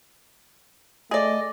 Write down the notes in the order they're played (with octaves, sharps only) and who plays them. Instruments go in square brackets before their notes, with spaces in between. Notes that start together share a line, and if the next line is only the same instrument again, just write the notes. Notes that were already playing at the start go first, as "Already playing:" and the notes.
[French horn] A3 [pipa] G#4 D5 [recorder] D#5